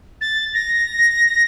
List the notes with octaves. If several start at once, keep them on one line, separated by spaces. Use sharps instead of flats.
A6
A#6